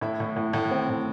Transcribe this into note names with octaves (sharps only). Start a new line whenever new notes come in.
A2 E4 E5
A2
A2
A2
C4
A2